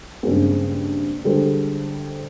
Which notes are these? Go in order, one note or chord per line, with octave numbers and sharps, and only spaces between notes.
G2 C#3 G#3 A#3 C4
D3 G3 G#3 A4 C5